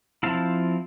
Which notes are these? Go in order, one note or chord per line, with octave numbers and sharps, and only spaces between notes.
F3 A3 C4 E4 F5 A5